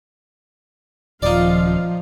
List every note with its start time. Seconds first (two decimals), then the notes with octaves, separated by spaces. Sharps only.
1.22 D#1 F3 D#4 F4 D5 F5